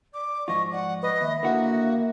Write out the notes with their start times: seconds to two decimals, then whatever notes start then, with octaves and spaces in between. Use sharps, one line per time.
0.14 D5 D6
0.48 G#2 F3 F4 D#5 C#6
0.72 D5 F#5
1.03 B4 D#5 D#6
1.21 D#2 E5
1.43 D3 A#3 E4 F#4 F#5